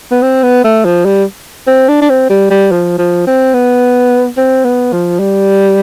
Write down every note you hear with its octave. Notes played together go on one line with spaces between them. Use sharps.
B3
C4
B3
A3
F3
G3
C4
D4
D4
C4
G3
G3
F3
F3
C4
B3
C4
B3
F3
G3